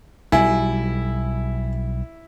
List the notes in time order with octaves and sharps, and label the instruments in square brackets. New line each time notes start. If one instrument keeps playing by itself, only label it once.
[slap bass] B1 G3 [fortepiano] E4 [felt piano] G#5